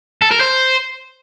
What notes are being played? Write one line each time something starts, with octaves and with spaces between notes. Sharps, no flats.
A4
A#4
C5